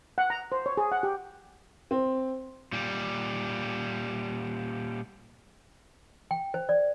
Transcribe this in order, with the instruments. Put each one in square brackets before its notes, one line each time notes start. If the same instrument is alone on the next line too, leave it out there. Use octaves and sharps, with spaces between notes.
[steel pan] F#5
A#5
C5
C#5
G#4
F#5
G4
[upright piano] C4
[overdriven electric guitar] A#2 G3
[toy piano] G5
C5
D5